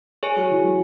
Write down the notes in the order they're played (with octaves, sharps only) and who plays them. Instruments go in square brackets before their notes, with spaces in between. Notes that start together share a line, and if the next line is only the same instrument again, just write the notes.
[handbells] G#4 C#5 G#5
[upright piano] F#3
E3
F#3